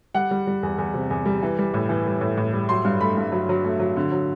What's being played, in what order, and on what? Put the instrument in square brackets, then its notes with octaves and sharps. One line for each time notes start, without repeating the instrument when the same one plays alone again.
[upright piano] G3 F#5
G3
G3
E2
E2
C3
E2
G3
E3
G3
A2
E3
G3
A2
A2
G3
F#3 C6
G2
A3 B5
G2
F#3
F#3
A3
F#3
D3
F#3